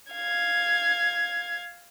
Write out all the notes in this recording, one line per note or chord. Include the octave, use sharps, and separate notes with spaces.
F5 G#6